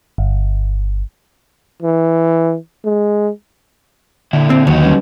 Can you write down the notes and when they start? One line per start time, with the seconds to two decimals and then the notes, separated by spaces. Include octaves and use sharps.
0.18 G1
1.83 E3
2.85 G#3
4.33 A#2 D3 E4
4.50 C4
4.67 D#2 F#3 D#4
4.82 G3 C#4 B4